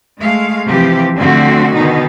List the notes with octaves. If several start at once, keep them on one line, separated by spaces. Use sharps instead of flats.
G#3 A3 F5
C3 E3 F3 G4
D3 F3 A3 C4 F#4
B2 D3 D#3 D#4